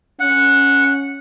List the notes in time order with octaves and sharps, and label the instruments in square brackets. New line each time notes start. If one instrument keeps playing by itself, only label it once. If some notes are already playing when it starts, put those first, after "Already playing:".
[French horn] C#4 [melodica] F#5